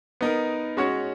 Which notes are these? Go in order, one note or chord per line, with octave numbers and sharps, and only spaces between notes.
B3 D#4 A#4
G#3 C#4 F#4 C#5